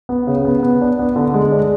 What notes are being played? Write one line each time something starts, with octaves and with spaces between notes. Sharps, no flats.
B3
C#3
B3
B3
D4
B3
D3
G#3
D4